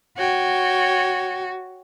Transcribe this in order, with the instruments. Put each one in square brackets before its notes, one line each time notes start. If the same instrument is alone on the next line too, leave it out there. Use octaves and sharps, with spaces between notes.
[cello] F#4 [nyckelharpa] C#5 G5